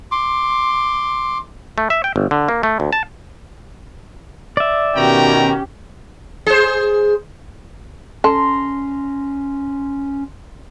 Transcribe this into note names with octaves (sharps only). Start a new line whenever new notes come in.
C6 D6
A3
E5
G5
G1
D3
A#3
A3
D2
A5
D5 E5
B2 D#3 C#4 F#4 G4 G5 A#5
G#4 C5
C#4 A4 A#5 C6